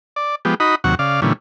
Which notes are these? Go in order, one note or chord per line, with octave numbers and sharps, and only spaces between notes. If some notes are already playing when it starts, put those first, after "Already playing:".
D5
F3 G#3 B3 G4
D#4 F#4 D#5 B5
D#2 C3 F#3 F#5 C#6
C#3 D5 F5
A#2 D3 E3 G3 C#4